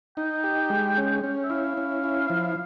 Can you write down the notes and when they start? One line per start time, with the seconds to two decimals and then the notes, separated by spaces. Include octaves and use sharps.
0.17 D#4 G5
0.44 G4
0.70 G#3
0.98 C#4
1.24 C#4
1.43 E5
1.50 E4 F5
1.77 C#4
2.04 E4
2.30 F3